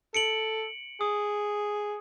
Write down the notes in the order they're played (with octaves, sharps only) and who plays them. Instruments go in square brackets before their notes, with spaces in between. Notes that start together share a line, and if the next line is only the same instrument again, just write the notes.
[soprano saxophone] A4 [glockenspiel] C#7 D7 F#7
[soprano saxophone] G#4 [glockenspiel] D#6